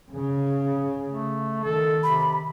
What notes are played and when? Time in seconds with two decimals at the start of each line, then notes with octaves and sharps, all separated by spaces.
0.12 C#3
1.08 A3
1.64 D#3 A4
2.03 C3 B5